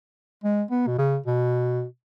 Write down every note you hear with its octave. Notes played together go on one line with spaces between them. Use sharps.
G#3
B3
B2
C#3
B2